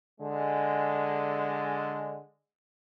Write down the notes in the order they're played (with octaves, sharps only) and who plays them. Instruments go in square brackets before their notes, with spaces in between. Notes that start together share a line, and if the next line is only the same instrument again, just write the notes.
[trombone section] D3 G#3